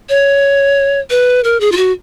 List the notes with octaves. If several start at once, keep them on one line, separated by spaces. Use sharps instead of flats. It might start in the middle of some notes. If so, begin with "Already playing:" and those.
C#5
B4
A#4
G#4
F4
F#4